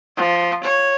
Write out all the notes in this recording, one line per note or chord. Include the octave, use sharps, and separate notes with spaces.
F3
C#5